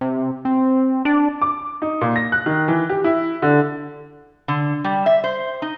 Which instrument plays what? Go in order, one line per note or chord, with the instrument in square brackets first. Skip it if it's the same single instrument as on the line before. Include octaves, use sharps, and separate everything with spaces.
[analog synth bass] C3
C4
[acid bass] D4
[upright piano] D6
D#4
A#2
A#6
F#6
D#3
E3
G4
E4
D3
[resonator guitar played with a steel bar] D3
G3
E5
C5
D#4